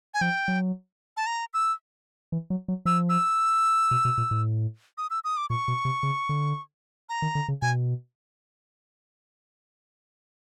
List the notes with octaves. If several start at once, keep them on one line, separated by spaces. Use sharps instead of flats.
G#5
F3 G5
F#3
A5
A#5
E6
E3
F#3
F#3
F3 E6
E6
B2
B2
A#2
A2
D#6
E6
D#6
D6
A#2 C#6
B2
C3
C#3
D3
A#5
D#3
D3
C#3
B2 G#5